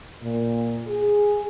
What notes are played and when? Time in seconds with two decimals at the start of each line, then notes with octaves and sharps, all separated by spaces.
0.22 A#2
0.88 G#4